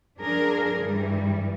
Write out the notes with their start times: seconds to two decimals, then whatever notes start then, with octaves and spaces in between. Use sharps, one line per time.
0.18 F3 D4 G#4 A#4
0.78 G2 E3 G3